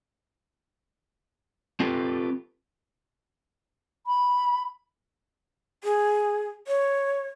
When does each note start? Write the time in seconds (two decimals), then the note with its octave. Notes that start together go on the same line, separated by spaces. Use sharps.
1.80 C4 F4 G4 A4 B4
4.07 B5
5.84 G#4
6.67 C#5